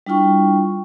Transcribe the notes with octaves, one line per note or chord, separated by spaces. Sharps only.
G3 D4 E4 F4 G5 C#6